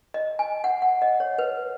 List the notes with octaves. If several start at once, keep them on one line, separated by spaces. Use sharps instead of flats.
D#5
G#5
F#5
F#5
D#5
C#5
B4